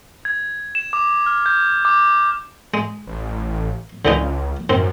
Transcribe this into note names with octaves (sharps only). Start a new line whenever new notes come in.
G#6
E7
D6
F6
G6
D6
G#3
A1
C#2 D3 E3 D#4
F#2 D#3 C4